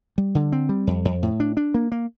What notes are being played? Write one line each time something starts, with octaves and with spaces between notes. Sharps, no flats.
G3
D3
C4
G3
F2
F2
A2
D4
D4
A#3
A#3